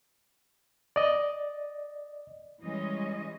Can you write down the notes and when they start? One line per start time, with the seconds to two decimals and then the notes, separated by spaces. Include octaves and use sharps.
0.96 D5 D#5
2.62 E3 G3 G#3 C#4 D#5